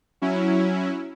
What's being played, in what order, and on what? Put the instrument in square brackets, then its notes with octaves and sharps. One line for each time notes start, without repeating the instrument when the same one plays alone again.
[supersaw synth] F#3 C#4 E4